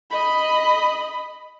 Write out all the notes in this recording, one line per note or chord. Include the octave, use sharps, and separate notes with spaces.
D#5 B5